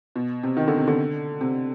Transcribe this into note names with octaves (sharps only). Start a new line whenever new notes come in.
B2
C3
D#3
D3
C3
D3
C3